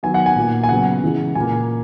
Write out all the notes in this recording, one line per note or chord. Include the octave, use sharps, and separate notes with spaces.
D#3 F#3 B3 G#5
F#5
G#5
A#2 A#3
G#5
C#3 F#3 B3 F#5
C#3 E3 G#3
A#2 A#3 G#5